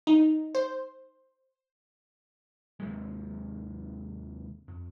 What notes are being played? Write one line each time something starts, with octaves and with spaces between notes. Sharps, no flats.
D#4
C5
D#2 C3 G#3
F2